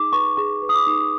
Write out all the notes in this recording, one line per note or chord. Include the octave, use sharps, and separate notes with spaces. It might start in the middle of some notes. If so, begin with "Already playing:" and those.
Already playing: D#4 G#4 D6
B4 C#6
G#4 C#6
B4
D#6
D6
D#4